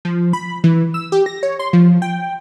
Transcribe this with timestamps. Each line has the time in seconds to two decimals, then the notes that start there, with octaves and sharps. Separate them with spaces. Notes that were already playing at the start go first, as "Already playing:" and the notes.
0.05 F3
0.33 B5
0.64 E3
0.94 E6
1.12 G4
1.26 A#6
1.43 C#5
1.59 C6
1.73 F3
2.02 G5